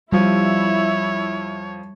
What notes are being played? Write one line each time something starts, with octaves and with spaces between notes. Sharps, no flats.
F2 F3 G3 E4 C#5